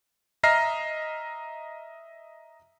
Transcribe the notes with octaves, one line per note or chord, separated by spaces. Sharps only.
D#5 E5 A#5 F6 A#6 C7